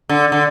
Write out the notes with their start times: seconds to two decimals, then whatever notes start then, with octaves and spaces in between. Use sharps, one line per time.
0.09 D3
0.32 D3